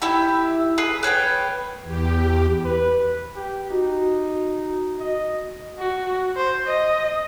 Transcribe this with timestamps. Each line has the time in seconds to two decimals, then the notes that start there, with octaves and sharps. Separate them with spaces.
0.02 E4 G4 E5
0.78 G#4 B4
1.03 B4 C#5 F#5 G5
1.83 E2 G4
2.65 B4
3.36 G4
3.71 D#4 F#4
5.00 D#5
5.78 F#4
6.37 C5
6.66 D#5